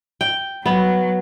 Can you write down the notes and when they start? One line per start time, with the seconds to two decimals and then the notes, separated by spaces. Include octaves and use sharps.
0.21 G5
0.66 F#3 B3